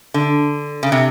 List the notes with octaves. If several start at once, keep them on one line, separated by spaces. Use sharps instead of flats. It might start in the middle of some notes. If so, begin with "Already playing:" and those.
D3
C#3
C3